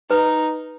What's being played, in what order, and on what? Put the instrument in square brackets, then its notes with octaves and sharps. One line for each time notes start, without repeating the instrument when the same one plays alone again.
[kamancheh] D#4 [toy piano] B4